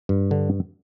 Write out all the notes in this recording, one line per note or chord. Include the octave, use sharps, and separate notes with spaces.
G2
D3